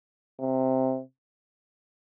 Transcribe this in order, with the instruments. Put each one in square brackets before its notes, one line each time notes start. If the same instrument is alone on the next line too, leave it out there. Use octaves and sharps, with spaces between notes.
[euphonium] C3